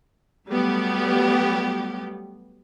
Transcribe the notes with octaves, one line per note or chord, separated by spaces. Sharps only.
F#3 G3 A3 B3 G4